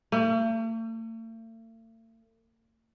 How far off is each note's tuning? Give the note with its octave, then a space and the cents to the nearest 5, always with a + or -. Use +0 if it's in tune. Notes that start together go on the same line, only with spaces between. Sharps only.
A3 +45